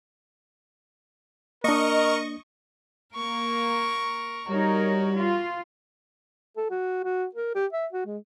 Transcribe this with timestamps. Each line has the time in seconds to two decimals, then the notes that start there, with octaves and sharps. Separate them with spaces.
1.64 A#3 D4 A#4 D#5 C#6
3.15 A#3 A#4 C#6
4.49 G3 D#4 F#4 A#4 C#5
5.16 F4
6.57 A4
6.70 F#4
7.04 F#4
7.35 A#4
7.55 G4
7.73 E5
7.93 F#4
8.06 G#3